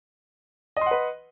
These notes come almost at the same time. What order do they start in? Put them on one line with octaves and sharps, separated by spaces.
D#5 C6 F#5 B4